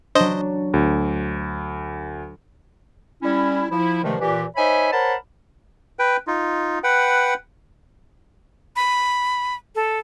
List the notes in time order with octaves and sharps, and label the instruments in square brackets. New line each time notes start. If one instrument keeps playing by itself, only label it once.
[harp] F#3 D4 [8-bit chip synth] C5 D#5
[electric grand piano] D2
[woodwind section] G3 C#4 E4
F3 E4
G2 C3 D#3 F3 G#3 A3
A#2 E3 G4
D#4 C5 C#5 E5 G#5 B5
A#4 C5 C#5 F#5 A5 B5
[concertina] B4 G5
D#4 F4
B4 F#5 G5
[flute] B5
A4